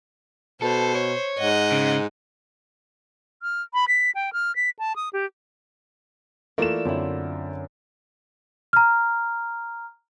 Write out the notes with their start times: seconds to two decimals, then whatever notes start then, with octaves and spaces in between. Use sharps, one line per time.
0.62 B2 A4 C5
0.95 C#5
1.38 G#2 D#5 F#5
1.72 C#3
3.42 F6
3.74 B5
3.88 B6
4.15 G5
4.33 F6
4.56 B6
4.79 A5
4.96 D#6
5.13 G4
6.58 E3 A3 A#3 F4 D5 E7
6.85 F#2 D3 C4 E4
8.73 A#5 F6